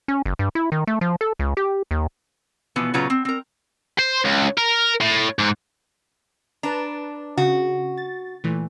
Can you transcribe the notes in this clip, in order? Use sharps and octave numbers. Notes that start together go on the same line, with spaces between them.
C#4
F#1
G2
E4
D#3
A3
F3
A4
C#2
G4
D#2
B2 E3 F3 B3
A#2 C#3 F#3 F4 B4 A#5
C4
C4 A#4
C5
C#2
A#4
A2
G#2
D4 B4 A5 A#5
C#3 F#4
A6
A#2 E3 A3